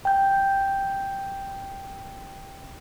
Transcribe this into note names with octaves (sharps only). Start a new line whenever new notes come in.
G5 G6